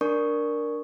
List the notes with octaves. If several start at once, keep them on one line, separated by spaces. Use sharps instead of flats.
D4 A#4 D5 C#6 D#6